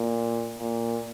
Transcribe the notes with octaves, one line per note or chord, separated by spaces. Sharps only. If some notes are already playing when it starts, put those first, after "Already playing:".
Already playing: A#2
A#2